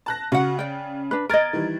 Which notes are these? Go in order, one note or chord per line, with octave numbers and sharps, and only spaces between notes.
A5 F#6 A#6
C#3 F#4 F#5
D5 G5
D4 B4
A#4 D#5 G#6 A6 D7
D#3 E3 G3